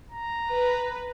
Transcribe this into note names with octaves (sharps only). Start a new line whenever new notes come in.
A#5
B4